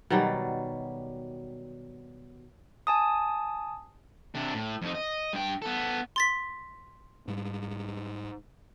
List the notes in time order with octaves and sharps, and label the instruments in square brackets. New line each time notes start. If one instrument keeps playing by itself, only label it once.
[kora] B2 D#3 F#3 G3
[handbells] G#5 A5 D#6
[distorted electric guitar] C3 D4
A2
F2 D#4
D#5
G2 G5
B3 A4
[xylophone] C6 A6 B6
[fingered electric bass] G#2 G3